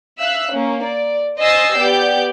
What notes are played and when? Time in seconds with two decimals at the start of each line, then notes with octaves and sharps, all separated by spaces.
0.19 E5 F5 E6 F#6
0.52 A#3 C#4
0.82 D5
1.40 C5 D#5 G#5 E6 A6 C7
1.78 B3 G4 D5 G6